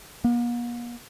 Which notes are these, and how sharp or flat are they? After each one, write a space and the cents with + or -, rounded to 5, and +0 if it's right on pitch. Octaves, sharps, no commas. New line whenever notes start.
A#3 +45